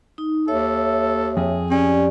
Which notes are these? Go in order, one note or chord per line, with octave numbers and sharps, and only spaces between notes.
D#4
D#2 A4 C#5 E5
F2 G#4
C#4 G4 D5